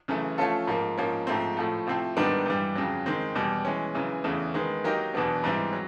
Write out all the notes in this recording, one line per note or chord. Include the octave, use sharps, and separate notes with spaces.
F#2 C#3 E3 A3
F3 A3 C#4 F4 A4
G#2 F3 A#3
G#2 F3 A#3 C#4
G#2 F3 A3 C4
A2 F3 A3
C3 F3 A3 C4 E4
G#2 D#3 G3 B3 D4
G2 E3 G3
F2 C#3 F#3
D#3 G#3 C4
E2 B2 G3
E3 G#3 C#4
F#2 C#3 E3
E2 C#3 E3 A3
D#3 G#3 B3
F#3 A#3 D#4 G4 A#4
E2 B2 F#3 B3 D4
G#2 E3 G3 C4 E4
F#3